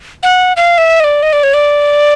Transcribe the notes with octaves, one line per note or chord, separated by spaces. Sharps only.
F#5
F5
E5
D#5
D5
D#5
D5
C#5
D5